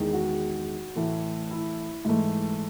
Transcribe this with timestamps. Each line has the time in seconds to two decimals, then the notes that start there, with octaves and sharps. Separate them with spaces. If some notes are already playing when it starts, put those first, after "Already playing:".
Already playing: E2 D#3 G#3
0.13 F#4
0.96 A2 E3 A3
1.51 E4
2.05 G#2 E3 A3